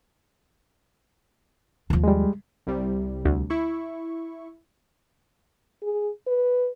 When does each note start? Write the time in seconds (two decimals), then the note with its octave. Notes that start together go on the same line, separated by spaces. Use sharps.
1.90 D#2 F3
2.04 G3 G#3
2.67 C2 C3 G3
3.25 D2
3.50 E4 C#6
5.82 G#4
6.27 B4